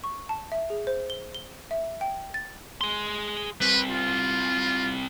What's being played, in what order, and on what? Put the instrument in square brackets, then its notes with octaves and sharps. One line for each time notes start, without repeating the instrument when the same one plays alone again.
[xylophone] C#6
A5
E5
G#4
C5
G7
G7
E5
G5
A6
[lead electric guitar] G#4 C6
[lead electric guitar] G3 C4 [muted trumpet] B4
[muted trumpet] F4